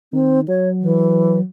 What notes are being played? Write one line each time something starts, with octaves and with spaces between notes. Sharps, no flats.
D#3 C4
F#3 C#5
E3